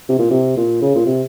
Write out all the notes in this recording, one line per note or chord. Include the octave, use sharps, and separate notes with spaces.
C3
A#2
C3
A#2
C#3
A#2
C3